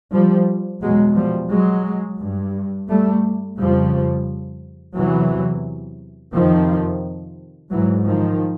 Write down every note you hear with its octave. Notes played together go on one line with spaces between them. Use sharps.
F3 G3
E2 B2 F#3 G#3
F3 G3
F#3 G#3
G2
G3 A3
F2 C#3 F3 G3
E2 C3 E3 F#3
F2 C3 D#3 F3
G#2 E3 F#3
D#3 F3